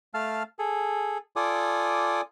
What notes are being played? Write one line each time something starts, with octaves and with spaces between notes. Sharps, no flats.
A3 F5 A5 F6
G#4 A4
F4 A4 D5 G#5 D6 D#6